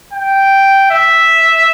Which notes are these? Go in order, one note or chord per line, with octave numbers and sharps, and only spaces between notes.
G5
E5